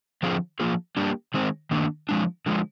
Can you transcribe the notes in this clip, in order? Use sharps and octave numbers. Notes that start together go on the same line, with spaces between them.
D3 F3 C4 F4 G#4
F3 A#3 F4 G#4
G3 A#3 D4 G4
D#3 G#3 C4
D#3 A#3 D4
F3 G#3 D4
D3 F3 G#3